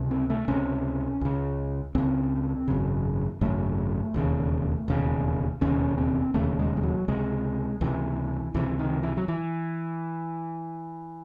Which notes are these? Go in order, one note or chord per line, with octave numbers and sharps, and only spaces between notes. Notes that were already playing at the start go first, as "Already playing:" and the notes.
Already playing: C#2 C3
C4
A3
C#2 C3 C#4
C#2 C#3
C#2 C#3 C4
G#1 F#2 C#3
G#1 F#2 C#3 A3
E1 D#2 C#3
E1 D#2 C#3
E1 D#2 C#3 C#4
C4
E1 D#2 C#3 A3
G#3
G#3
F#3
C#2 C3 G#3
C#2 C3 E3
C#2 C3 E3
D#3
E3
F#3
E3